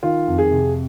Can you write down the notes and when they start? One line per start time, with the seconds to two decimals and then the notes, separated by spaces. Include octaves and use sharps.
0.03 D#3 F4
0.28 F2
0.38 G#4
0.51 C3